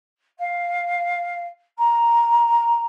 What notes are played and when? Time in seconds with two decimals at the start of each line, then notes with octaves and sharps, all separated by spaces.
0.39 F5
1.78 A#5